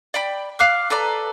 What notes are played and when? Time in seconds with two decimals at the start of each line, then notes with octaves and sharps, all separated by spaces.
0.14 D5 G5 B5
0.59 F5 D6 F#6
0.90 A4 B4 D5 A#5